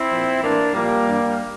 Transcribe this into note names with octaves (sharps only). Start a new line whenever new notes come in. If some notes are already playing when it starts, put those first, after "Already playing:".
Already playing: C4 E4
A#2 F3
A2 E3 A#3 D4
A#2 F3 G3 A#3
G2 E3